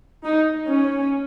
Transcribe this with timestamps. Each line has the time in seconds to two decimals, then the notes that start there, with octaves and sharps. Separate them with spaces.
0.24 D#4
0.67 C#4